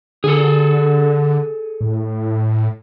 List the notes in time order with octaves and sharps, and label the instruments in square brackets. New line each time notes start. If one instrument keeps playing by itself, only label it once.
[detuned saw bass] D3 [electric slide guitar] G#4 A4
[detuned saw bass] A2